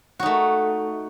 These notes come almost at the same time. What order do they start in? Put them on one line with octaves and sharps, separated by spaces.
F#4 D#4 A3